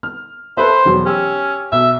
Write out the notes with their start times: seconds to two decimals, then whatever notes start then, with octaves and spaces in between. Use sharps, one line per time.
0.03 F6
0.57 A4 B4 C5 E5
0.85 E1 F#3
1.06 C#4 G4 E6
1.72 B1 E5